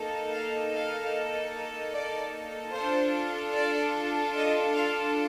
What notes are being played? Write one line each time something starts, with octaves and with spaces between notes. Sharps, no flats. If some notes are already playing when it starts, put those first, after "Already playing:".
Already playing: A#3 D#4 A4
F5
F5
D5
D4 F4 A4 C5
D5
D#5
F5